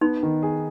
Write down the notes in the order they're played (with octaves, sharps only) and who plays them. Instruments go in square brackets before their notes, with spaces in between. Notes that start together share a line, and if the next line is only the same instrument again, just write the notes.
[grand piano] B3 [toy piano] D#4
[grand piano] D#3
G#4